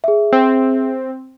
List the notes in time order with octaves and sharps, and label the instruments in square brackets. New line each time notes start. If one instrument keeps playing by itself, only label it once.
[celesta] G#4 E5
[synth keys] C4